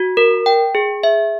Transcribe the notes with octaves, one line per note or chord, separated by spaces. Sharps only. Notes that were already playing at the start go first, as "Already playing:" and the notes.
Already playing: F#4
A#4
G5
G#4
E5